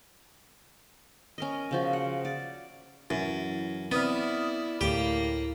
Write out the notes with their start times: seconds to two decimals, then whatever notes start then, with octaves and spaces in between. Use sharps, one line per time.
1.38 C#4 A#4 D#5
1.71 C#3 F3 F#4
1.93 F#5
2.25 D5
3.10 F#2 E3 E4 B4 E5
3.92 B3 C4 E4 D5 D#6 F6
4.81 D2 A2 A#3 G4